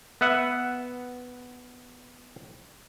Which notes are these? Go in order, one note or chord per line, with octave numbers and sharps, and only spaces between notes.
B3 B4 E5 F#5